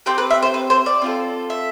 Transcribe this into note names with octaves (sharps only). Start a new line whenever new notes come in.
C4 G4 G5
B4
E5
C5
B4
C5
D5
C4 F4 A4
E5